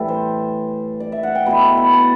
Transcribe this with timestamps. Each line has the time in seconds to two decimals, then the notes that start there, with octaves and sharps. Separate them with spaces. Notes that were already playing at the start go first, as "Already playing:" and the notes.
Already playing: A2 E3 G3 A4
0.08 C5
1.00 D5
1.12 E5
1.23 F#5
1.35 G5
1.46 B2 A3 E4 B5
1.63 C6
1.77 B5
1.93 A5